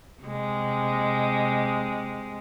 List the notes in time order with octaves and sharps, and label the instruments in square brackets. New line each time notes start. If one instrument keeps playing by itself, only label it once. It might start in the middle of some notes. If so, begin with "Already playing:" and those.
[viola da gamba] C3 G#3